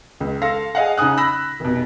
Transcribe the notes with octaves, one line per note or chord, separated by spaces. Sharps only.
C#2
A4 F5 C6 A#6
G#4 D#5 F5 F#5
C#3 D#4 G#5 D#6 F#6
B5 E6 F#6 A#6 B6
F1 B2